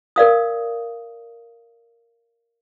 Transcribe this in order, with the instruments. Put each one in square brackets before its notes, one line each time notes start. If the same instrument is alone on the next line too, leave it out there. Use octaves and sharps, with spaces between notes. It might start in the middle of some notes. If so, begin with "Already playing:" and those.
[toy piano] A#4 D5 F5 D#6